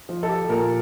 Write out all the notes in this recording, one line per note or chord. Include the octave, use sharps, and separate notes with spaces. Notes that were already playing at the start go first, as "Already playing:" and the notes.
F3
A4
G4
A#2 A#4